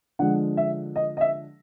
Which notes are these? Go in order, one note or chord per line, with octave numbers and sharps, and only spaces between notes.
D3 F3 G#3 F#5
E5
D#5
D#5
E5